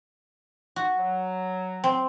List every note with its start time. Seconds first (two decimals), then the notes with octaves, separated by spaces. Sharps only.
0.76 F#4
0.98 F#3
1.84 C4